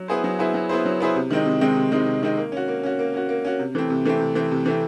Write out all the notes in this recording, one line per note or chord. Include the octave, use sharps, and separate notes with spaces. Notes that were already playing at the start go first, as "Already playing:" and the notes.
Already playing: F#3
B3 E4 G#4 C5
F#3
B3 E4 G#4 C5
F#3
B3 E4 G#4 C5
F#3
B3 E4 G#4 C5
C3
D#3 G#3 C4 D#4
C3
D#3 G#3 C4 D#4
C3
D#3 G#3 C4 D#4
C3
D#3 G#3 C4 D#4
A#3
C#4 F#4
A#3
C#4 F#4
A#3
C#4 F#4
A#3
C#4 F#4
C3
E3 A3 C4
C3
E3 A3 C4
C3
E3 A3 C4
C3
E3 A3 C4